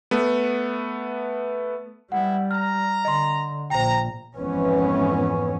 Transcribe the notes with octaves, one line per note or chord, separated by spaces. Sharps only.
A3 B3
G3 G#3 B3 E4 F#5
A#5 F6
D3 D#5 C6
A#1 C5 G5 A#5
G#1 F2 E3 B3 C#4